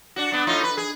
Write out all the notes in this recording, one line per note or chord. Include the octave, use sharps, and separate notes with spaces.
D4 F#4
B3 D4
A2 D#4 F4
B4
G#4